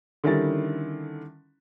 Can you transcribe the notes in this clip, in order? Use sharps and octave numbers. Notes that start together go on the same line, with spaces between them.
D3 D#3 G3 C#4 E4 A6